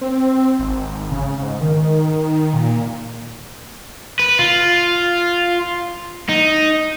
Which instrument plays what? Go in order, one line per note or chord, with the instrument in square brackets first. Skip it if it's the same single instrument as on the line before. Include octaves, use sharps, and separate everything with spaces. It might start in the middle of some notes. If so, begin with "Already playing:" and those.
[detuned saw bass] C4
G#1
C#3
G#2
D#3
A#2
[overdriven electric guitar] B4
F4
D#4